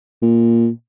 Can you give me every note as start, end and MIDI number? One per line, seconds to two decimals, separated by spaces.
0.22 0.68 46